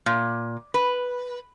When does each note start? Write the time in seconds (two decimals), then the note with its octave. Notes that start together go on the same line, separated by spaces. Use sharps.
0.06 A#2
0.74 B4